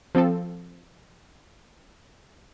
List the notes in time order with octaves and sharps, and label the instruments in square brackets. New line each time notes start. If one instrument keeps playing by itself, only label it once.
[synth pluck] F3 C4 F4 A4